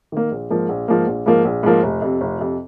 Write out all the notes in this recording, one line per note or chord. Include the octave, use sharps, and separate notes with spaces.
D#3 A#3
A#1
G#2 F3 A#3
A#1
G#2 F3 A#3
A#1
G#2 F3 A#3
A#1
G#2 F3 A#3
F1
F2 C3
F1
F2 C3